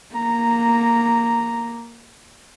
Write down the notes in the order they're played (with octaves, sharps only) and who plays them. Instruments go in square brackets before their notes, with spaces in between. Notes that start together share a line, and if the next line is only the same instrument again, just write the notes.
[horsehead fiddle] A#3 [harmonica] A#5